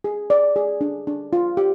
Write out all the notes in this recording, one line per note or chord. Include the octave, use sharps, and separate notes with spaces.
G#4
D5
G#4
D4
D4
F4
G4